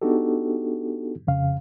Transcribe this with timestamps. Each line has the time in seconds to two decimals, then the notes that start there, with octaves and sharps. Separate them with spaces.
0.02 B3 D4 D#4 F#4 G4 A4
1.27 F2 C#3 F5